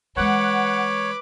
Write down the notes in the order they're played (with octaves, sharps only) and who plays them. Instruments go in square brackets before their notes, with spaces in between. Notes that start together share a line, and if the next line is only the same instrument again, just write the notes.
[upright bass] E3 G#3 [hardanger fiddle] B4 D6 [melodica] C#5 [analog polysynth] F#5